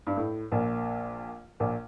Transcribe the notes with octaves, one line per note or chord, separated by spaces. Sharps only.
G2
A2
A#1 A#2
A#1 A#2